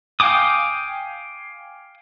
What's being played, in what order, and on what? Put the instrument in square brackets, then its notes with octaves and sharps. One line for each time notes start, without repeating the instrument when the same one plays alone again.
[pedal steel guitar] F5 G5 G#5 D6 D#6